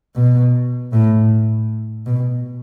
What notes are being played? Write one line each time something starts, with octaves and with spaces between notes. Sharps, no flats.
B2
A2
B2